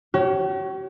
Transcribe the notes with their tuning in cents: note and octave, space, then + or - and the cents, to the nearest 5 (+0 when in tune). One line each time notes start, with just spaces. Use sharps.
G4 -45 C#5 +0